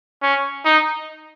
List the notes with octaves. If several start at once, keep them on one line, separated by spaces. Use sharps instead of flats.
C#4
D#4